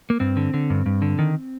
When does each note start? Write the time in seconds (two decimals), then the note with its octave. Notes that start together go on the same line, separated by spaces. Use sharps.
0.10 A#3
0.20 G2 C4
0.37 D3
0.54 D3
0.70 G2
0.86 G2
1.02 D3
1.19 D#3